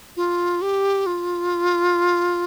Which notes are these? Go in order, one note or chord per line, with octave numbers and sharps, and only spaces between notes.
F4
G4
F4